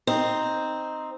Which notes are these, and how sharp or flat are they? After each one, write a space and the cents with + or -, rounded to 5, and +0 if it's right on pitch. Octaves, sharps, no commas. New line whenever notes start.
C4 +0 D#4 +0